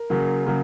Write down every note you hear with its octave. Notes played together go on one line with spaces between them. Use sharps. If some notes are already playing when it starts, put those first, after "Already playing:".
Already playing: A#4
C#3 F#3 A#3
C#3 F#3 A#3